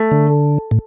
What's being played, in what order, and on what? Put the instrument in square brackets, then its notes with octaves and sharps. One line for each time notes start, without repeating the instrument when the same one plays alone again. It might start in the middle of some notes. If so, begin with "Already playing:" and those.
Already playing: [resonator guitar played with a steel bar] A3
[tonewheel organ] D3
A2